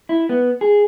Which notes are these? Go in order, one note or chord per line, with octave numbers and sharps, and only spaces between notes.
E4
B3
G#4